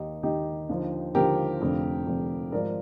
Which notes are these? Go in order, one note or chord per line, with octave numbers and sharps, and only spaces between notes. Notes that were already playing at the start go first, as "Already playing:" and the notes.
Already playing: D#2 D#3 D#4 G4
D#2 D#3 D#4 G4
D#2 D3 F3
D#2 D3 F3 G4 A#4
F1 F2 D3 F3
F1 F2 D3 F3
G#1 G#2 F3 A#4 D5